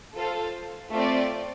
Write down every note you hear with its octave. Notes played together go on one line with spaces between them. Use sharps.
F4 A4 C5 F5
A3 C4 F4 D5